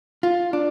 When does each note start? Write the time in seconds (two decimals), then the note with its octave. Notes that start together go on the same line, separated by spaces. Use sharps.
0.23 F4
0.53 D4